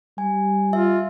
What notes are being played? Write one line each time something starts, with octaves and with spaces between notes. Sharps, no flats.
G3 G#5
F4 E5